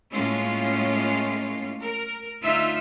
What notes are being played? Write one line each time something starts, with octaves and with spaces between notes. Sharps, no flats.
A2 G#3 A#3 C#4 F4
A#4
D2 D#4 F4 E5